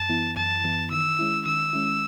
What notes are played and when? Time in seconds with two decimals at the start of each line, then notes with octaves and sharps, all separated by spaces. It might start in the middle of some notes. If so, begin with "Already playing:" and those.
Already playing: F#2 A5
0.09 E3 B3 E4
0.37 F#2 A5
0.64 E3 B3 E4
0.91 D#3 E6
1.19 G#3 C#4 E4
1.46 D#3 E6
1.73 G#3 C#4 E4